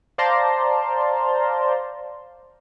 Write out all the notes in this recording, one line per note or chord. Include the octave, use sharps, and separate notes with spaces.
C5 D5 F5 A5 A#5 C6